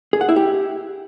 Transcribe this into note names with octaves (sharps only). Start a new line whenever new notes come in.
G#4
F#5
E4
G4